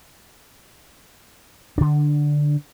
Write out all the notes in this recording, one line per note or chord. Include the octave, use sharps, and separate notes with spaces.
D3 D4